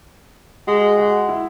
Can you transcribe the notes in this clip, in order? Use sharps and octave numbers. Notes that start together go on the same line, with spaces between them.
G#3 F#4
F#4
E4